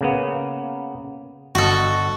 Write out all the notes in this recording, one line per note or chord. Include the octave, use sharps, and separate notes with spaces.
C#3 A#3 B3
G1 F#4 A4 D#5